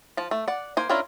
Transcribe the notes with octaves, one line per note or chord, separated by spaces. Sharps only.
F3 A5
A3
D5 F#5
A#3 C5 G#5
C#4 D4 E4 F4 A#4